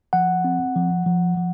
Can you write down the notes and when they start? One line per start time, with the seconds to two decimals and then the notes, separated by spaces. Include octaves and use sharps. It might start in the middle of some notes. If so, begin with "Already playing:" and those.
0.13 F3 F#5
0.44 C4
0.76 F3
1.06 F3
1.37 F3